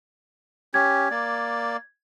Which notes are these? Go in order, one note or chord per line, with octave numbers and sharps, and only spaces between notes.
C#4 G4 G#6
A#3 D5